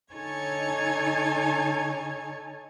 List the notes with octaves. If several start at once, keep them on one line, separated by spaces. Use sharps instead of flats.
D3 D#4 A4 C#5 G#5 G#6